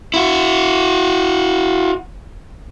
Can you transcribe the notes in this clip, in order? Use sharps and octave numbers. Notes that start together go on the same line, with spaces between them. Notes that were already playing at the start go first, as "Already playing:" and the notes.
E4 F#4